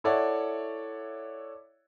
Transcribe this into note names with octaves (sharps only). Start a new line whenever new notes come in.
E4 A4 C#5 D5 E5 F#5